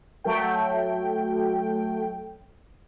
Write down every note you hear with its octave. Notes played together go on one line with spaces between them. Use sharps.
F#3 A3 G5